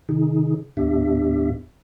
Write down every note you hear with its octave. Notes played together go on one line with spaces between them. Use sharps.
C3 D#3 D#4 G#4
D#2 A2 B3 D4 G4 E5